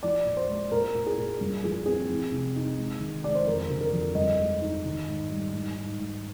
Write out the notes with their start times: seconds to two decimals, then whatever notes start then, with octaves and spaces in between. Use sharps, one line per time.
0.03 F3 D5
0.25 A#2
0.37 C5
0.49 G#3
0.72 A#2 A#4
0.95 A#2
1.07 G#4
1.18 A#2
1.41 G2
1.64 F3 G#4
1.86 C4 G#4
2.09 F3
2.32 C3
2.56 D#4
2.78 G#3
3.01 D#3
3.24 G#3 D5
3.35 C5
3.46 F2 A#4
3.70 D3
3.81 A#4
3.93 F2
4.15 G2 D#5
4.39 G#3
4.61 D#4
4.85 D#3
5.08 G#2
5.30 G3
5.53 G#2
5.75 G#2
5.99 G#2